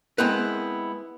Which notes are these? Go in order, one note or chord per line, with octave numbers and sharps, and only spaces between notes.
G#3 B3 C4 E4 A#4 B4